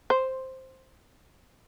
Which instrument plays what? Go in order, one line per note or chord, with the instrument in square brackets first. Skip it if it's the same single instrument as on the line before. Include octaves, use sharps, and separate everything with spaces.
[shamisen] C5